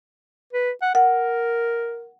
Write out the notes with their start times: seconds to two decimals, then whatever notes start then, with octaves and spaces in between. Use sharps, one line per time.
0.53 B4
0.82 F#5
0.95 A#4 F#5